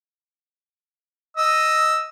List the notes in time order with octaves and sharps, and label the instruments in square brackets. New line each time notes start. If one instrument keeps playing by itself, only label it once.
[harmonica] D#5 E6